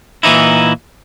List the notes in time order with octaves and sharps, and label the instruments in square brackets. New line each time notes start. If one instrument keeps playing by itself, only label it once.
[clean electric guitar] A#2 E3 D#4 E4